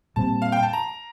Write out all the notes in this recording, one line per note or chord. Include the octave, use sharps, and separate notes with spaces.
A#2 G3 C4 A5
F5
G5
A5
A#5